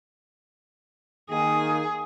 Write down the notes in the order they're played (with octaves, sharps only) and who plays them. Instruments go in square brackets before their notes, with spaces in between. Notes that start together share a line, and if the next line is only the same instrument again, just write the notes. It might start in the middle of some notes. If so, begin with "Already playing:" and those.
[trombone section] D#3 A#3 [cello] G#4